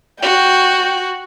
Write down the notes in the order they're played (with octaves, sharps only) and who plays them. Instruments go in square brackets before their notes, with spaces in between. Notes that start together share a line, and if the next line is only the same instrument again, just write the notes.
[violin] F#4 [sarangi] G5